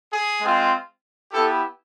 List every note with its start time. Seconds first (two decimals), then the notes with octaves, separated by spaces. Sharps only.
0.11 G#4
0.41 G#3 C4 F4
1.32 B3 E4 G4 A4